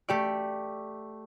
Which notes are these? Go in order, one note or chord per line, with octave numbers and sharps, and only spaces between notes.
A3 G4 D5